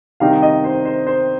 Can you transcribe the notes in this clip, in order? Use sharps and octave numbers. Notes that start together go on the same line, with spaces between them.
C3 D#3 G3 D#4 F5
D#5
C5
C5
C5